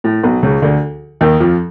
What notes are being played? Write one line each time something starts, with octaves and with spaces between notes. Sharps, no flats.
A2
B1 B2
C#2 C#3
D2 D3
D#2 D#3
F2 F3